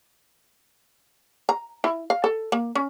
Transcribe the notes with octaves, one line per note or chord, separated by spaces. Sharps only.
A#5
E4
F5
A4
A#3
C#4